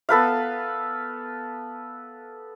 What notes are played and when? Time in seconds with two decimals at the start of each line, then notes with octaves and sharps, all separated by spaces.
0.09 B3 A4 B4 F5